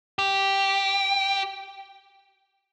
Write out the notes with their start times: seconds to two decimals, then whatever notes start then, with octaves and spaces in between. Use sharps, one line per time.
0.19 G4